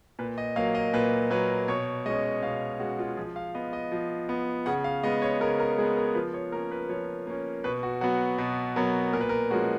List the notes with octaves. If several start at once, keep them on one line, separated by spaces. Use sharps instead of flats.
A#2 B4
D#5
F#3 A#3 F5
D#5
A#2 B4
F#3 A#3 B4
B2 C#5
G#3 C#4 D#5
B2 F5
G#3 C#4 F#4
F4
F3 G#4
F5
B3 D#5
D#5
F3
B3
C#3 F#5
F5
G#3 B3 D#5
C#5
C#3 A#4
A#4
G#3 B3 G#4
A#4
F3 B4
C#5
A#3 C#4 A#4
B4
F3 C#5
A#3 C#4
B2 B4
F#4
F#3 B3 F#4
B2
F#3 B3 A#4
A#2 A#4
B4
A#4
F3 G#3 C#4 F#4